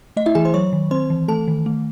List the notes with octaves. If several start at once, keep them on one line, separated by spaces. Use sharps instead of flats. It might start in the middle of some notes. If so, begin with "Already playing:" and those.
A3 D#5
E4 E5
E3 G#4 G#5
C5 C6
F#3 C#5 C#6
D#3
C4 C5 C6
E3
A3 A4 A5
D#3
A3